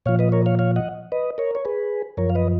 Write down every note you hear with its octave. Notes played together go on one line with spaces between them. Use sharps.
A#2 F3 C#5 F5
B4 D#5
A#4 C#5
C#5 F5
C#5 F5
D#5 F#5
B4 D#5
A#4 C#5
C#5
G#4 B4
F#2 F3 A#4 C#5
F5
B4 D#5